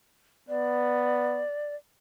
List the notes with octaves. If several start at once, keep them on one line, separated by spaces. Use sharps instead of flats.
B3 D5